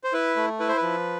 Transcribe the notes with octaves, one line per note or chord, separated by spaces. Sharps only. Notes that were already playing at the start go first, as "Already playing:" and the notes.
C5
E4 B4
A3
E4 B4
C5
B4
F3